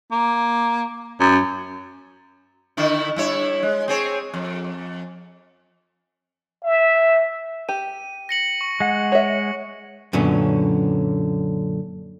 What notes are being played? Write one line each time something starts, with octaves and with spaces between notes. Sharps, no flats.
A#3
F#2
D3 D#3 E4
G2 E4 C#5
G#3
C4 G#4 C#5
F2
E5
G4 D#7
A#6 C#7 F#7
C#6
G#3 F#5
C#5 E5
F#2 A#2 D3 B3 C#4